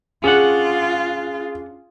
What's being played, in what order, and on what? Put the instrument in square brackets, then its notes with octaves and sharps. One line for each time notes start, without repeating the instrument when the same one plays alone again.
[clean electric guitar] C#4 D4 F#5 [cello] F4 [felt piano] G#4